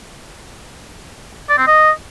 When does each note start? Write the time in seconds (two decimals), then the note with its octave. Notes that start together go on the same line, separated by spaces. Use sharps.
1.50 D5
1.58 C4
1.67 D#5